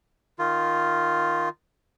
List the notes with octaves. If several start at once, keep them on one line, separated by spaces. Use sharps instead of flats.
D#3 F4